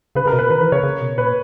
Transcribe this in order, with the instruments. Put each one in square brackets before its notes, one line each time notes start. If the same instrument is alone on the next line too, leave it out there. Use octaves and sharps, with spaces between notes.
[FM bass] C#3 [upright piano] B4
[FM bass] C#3 [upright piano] A#4
[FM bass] B2
[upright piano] B4
[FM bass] D#3 [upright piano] B4
[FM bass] E3 [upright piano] B4
[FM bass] C#3 [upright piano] C#5
[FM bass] C#3
B2
[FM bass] A#2 [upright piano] B4